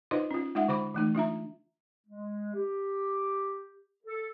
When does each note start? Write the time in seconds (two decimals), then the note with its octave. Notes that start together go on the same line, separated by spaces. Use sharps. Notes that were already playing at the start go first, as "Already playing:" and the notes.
0.11 D#4 F4 B4 C5 D#5 C6
0.31 C#4 F4
0.55 G#3 D#4 F4 E5 F#5
0.68 D3 C5 B5 D6
0.94 E3 A3 D#4
1.15 D4 F4 E5 A#5
2.07 G#3
2.54 G4
4.05 A4